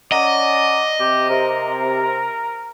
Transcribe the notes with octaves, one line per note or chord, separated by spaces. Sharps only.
C#4 D5 D#5 F#5 A#5
C3 G4
C3 A#4